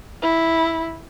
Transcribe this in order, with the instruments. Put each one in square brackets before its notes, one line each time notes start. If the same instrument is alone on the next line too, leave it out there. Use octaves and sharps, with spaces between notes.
[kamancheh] E4